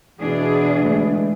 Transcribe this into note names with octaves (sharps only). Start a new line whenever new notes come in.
B2 E3 D4 G#4
D3 G#3 A3